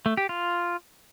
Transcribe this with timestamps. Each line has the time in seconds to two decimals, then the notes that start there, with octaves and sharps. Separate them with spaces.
0.06 A3
0.17 G4
0.29 F4